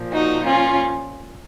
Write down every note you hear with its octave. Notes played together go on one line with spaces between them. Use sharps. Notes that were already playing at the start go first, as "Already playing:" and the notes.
Already playing: A#2 F3
D#4 F#4
C#4 F4